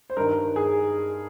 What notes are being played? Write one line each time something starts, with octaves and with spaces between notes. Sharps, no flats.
C5
G2 D#3 A#4
G#4